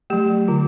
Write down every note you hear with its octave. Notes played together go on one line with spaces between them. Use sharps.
F#3 A3 G4
D3 F4